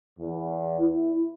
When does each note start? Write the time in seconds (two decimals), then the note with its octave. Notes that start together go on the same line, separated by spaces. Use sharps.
0.19 E2
0.80 E4